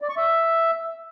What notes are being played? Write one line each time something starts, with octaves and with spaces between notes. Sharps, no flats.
D5
C#6
E5